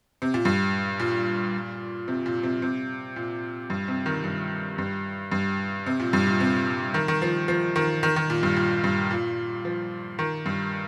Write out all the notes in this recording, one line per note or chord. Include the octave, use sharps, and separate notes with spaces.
C3
A#2
G2
A#2
C3
A#2
C3
C3
A#2
G2
C3
D#3
G2
G2
G2
C3
A#2
G2
A#2
C3
D#3
D#3
F3
F3
D#3
D#3
D#3
A#2
G2
A#2
G2
A#2
F3
D#3
G2